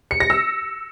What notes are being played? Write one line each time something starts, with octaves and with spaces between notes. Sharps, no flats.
C#7
A#6
E6